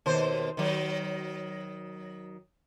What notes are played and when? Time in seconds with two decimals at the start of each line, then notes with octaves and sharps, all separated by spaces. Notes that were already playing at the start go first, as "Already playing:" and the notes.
0.06 D#2 B2 C5
0.57 D#3 F#3